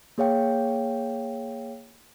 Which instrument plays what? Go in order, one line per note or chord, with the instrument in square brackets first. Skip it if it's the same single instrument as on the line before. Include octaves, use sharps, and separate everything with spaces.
[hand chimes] A#3 G#4 C#5 F5 G5